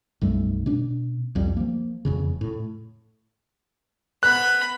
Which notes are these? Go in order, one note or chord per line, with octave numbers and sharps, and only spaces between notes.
B1 F#2 G3 A3
B2 C#4 D4
C2 F2 G3
F3 A#3
E1 F2 C#3
A2
B3 B5 F#6